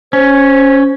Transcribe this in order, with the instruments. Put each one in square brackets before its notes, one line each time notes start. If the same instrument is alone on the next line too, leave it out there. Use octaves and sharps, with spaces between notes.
[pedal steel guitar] C#4 [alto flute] C5